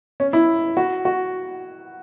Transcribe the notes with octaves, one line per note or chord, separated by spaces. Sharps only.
C#4
E4
F#4
F#4